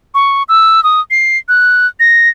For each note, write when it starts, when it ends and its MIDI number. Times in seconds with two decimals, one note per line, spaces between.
0.14 0.43 85
0.49 0.83 88
0.84 1.00 87
1.11 1.38 96
1.49 1.87 90
2.00 2.29 94